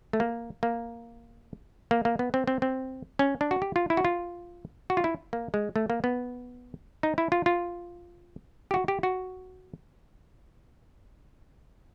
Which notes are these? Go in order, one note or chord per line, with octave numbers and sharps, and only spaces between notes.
A3
A#3
A#3
A#3
A#3
B3
C4
C4
C4
C#4
D4
F#4
G4
F4
E4
F#4
F4
F#4
F4
E4
A#3
G#3
A3
A#3
B3
D#4
E4
F4
F4
G4
F#4
G4
F#4